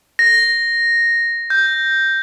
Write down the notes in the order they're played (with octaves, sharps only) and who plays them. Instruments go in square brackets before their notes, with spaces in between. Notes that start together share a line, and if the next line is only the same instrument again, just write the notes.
[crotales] A#6
G6